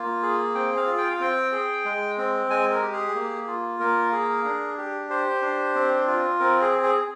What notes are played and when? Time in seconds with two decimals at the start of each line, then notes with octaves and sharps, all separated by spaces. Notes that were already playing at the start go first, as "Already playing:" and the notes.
Already playing: A#3 F4
0.22 G#4
0.55 C4 G5
0.77 F5
0.87 F4
0.98 G5
1.10 F5
1.20 C4 G5
1.52 G#4
1.85 G#3
2.18 C4
2.50 G#3 G#5
2.71 A#4
2.82 G4
2.93 G#4
3.15 A#3
3.47 F4
3.80 A#3 A#4
4.12 G#4
4.45 D4
4.78 G4
5.10 G4 C5
5.42 D4
5.75 C4
6.07 F4
6.40 C4 A#4
6.62 G#4
6.72 G#4
6.83 G#4